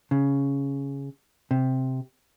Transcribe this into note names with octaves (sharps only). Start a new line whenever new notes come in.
C#3
C3